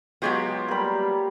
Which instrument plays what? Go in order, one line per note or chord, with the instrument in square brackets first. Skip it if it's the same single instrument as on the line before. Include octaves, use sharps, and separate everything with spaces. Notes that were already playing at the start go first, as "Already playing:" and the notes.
[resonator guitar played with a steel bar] F#3 G#3 B3 [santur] F4 G4 C#5
[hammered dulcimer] G3 A#3 [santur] A#4 B5